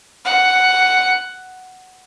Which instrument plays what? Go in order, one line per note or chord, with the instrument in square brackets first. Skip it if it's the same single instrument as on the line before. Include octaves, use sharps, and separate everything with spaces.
[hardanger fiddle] F#5